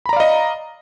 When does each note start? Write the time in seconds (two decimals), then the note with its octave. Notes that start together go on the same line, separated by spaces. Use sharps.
0.06 B5
0.09 A#5
0.13 D5
0.16 F5
0.20 D#5